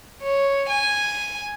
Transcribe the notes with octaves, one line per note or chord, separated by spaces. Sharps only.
C#5
G#5